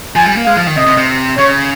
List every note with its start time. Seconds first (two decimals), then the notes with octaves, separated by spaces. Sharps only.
0.16 F3 G#5
0.26 G3
0.36 A#3
0.46 G#3 F5
0.57 F3
0.67 D#3
0.76 C3 D#5
0.87 C3
0.97 C3
1.37 C#3 C#5